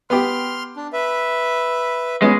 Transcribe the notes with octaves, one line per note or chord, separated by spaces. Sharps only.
B3 G4 C6 F6
D4
B4 E5
G#3 B3 C#4